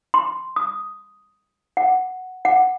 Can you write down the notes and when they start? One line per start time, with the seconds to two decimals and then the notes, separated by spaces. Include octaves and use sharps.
0.14 C6
0.56 D#6
1.77 F#5
2.45 F#5